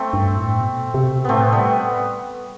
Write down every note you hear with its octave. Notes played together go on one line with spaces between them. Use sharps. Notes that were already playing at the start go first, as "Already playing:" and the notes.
Already playing: A3 C4
G2
A2
B2
C3
A2 A3 B3 C4
G3 B3